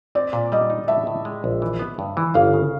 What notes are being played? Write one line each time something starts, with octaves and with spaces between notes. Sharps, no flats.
C4 D5
A#2
G3 D#5
D#4
A2 E5
A2
G#3
A#1
E3
B3
G2
E3
G1 F5
C#3